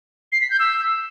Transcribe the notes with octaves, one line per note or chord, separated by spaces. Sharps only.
C7
B6
G6
E6